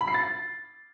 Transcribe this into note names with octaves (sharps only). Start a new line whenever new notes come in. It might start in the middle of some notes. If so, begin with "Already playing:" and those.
B5
C7
A6